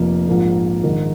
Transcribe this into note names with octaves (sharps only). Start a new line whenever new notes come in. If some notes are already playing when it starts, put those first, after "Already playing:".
Already playing: F1 F2 F3 A#3
A#1 G#2 F3 A#3
A#1 G#2 D#3